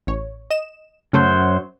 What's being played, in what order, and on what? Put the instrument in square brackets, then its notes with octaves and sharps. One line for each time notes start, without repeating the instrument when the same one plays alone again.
[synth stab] A1 C#5
D#5 E7
[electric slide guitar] F#2 F#3 C5 [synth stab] C#3 A3